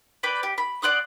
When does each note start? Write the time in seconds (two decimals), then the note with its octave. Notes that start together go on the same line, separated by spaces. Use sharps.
0.23 B4 D5 G5 B5
0.43 G4
0.58 B5
0.82 D5 F#5 C6 D#6